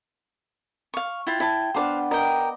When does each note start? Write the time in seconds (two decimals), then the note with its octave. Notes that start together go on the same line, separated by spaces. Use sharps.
0.94 F5 C#6
1.27 E4 F4 G5
1.40 E4 G5 A5
1.74 B3 D4 B4 C5 F5 F#5
2.11 A#4 D#5 G5